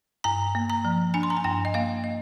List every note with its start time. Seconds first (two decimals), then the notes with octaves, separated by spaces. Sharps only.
0.24 G2 A#5
0.55 A#3
0.70 A#5
0.85 F3
1.14 D4 G#5
1.23 C6
1.30 A#5
1.37 G#5
1.44 G2 G5
1.65 D#5
1.74 A#3 F5
2.04 D#5